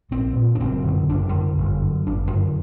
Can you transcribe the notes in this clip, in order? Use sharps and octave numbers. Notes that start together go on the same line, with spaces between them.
A#1 C4
A#2
D4
F#1 C4
F#2 D3
F#1 D4
F#2 D3
G1
F#2 D3
G1 D4
F#2 D3